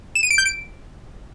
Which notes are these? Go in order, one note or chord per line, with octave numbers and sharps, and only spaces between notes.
E7
D#7
D7
G6
D7